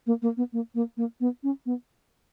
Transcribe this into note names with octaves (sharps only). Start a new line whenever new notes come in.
A#3
A#3
B3
A#3
A#3
A#3
B3
C#4
B3